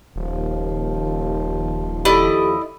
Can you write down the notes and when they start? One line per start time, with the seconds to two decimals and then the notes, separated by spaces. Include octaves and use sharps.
0.16 D#1 D#2 F3
2.05 E4 G4 A4 D5 D#5